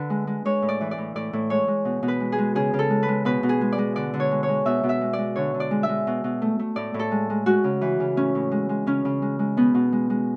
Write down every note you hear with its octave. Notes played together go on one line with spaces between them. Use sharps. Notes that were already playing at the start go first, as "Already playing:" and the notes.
Already playing: D3 B4
G#3
G#3
G#3 C#5
A2
D5
E3
D5
A2
A2 D5
A2
G#3 C#5
G#3
B2
B2
B4
G#3
G#4
G#3
C#3 G#4
C#3
A4
G#3
B4
G#3
B2 B4
B2
G#4
G#3
D5
G#3
D3 D5
D3
C#5
G#3
C#5
G#3
B2 E5
B2
E5
G#3
G#3 D5
D3 C#5
D3
D5
G#3
E5
G#3
B2
B2
A3
A3
A2 D5
A2
A4
G#3
G#3
G#3 F#4
C#3
E3
C#3
A2 C#4
A2
G#3
G#3
C#3 C#4
C#3
G#3
G#3
B2 B3
B2
G#3
G#3